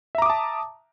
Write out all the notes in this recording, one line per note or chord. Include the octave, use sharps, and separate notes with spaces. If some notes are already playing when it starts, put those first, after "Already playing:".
E5 A5 A#5 D6 D#6